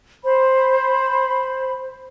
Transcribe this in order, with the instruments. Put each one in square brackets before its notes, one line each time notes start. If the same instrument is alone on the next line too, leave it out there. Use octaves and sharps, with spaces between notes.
[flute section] C5 B5